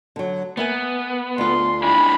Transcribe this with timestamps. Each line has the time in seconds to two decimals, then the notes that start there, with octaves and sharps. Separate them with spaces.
0.16 D3 F#3
0.57 A#3 B3 E5 G#5
1.38 D2 F4 C6
1.83 D4 E4 G#5 B5